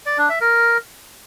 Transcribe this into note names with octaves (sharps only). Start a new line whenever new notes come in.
D5
D4
E5
A#4